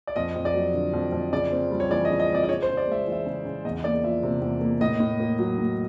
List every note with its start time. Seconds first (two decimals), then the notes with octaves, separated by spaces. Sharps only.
0.07 D5
0.16 F2 D#5
0.36 F2
0.45 D5
0.54 F#3
0.74 D3
0.94 F2
1.12 F2
1.32 C#3 D5
1.52 C4
1.71 G3
1.80 C#5
1.91 E3 D5
2.05 D#5
2.09 C#3
2.19 D#5
2.30 C4 D5
2.43 D5
2.49 C#3 C#5
2.62 C5
2.68 C#3
2.77 D5
2.87 G#3 E5
3.07 E3
3.12 E5
3.26 C#3
3.45 C#3
3.65 E2 D#5
3.84 A#3 D5
4.03 F3 E5
4.23 C3
4.42 E2
4.61 A#3
4.81 A2 D#5
5.00 A2
5.20 A#3
5.39 F#3
5.58 A2